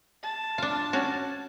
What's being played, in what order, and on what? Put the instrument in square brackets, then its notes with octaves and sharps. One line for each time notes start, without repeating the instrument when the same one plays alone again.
[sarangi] A5
[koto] D4 F4
C#4 F#4